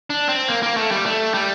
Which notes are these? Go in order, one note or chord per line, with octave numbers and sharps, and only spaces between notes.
D4
C4
A#3
A#3
A3
G3
A3
G3